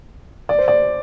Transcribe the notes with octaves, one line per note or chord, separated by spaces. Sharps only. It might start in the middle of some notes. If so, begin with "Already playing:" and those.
D5
C5
D5